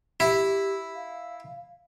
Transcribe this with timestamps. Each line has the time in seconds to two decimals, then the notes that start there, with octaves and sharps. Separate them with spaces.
0.20 E4 G4
0.95 F5